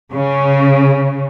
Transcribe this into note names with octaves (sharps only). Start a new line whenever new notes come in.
C#3